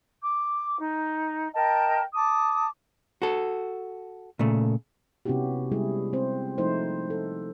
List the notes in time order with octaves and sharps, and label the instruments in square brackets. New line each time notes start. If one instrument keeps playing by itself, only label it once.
[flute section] D6
D#4
A#4 D#5 G5 A5
A5 D6 D#6
[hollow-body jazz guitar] F#4 A4
A#2 C#3 A3
[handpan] C3 B3 C#4 E4 F#4 G4
G3 G#3 E4 G#4
C4 C5
F3 A3 D#4 E4 C5
A4